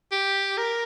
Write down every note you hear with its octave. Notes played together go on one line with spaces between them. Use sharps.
G4
A#4